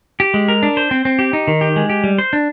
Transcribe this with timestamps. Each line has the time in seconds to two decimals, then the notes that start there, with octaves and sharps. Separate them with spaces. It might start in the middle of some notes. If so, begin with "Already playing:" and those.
0.20 G4
0.34 G#3
0.48 A#4
0.63 D4
0.77 C5
0.91 C4
1.05 C4
1.19 G4
1.33 D#4
1.48 D#3
1.61 G4
1.76 G#3
1.90 G4
2.04 G3
2.19 C5
2.33 D4